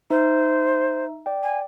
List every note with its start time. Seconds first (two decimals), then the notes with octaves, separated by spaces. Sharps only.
0.10 D#4 C5 E5
1.26 D5 G5
1.43 G#5